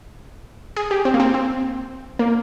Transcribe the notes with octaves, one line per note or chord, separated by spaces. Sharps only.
G#4
G4
C4
A#3
C4
C4
A#3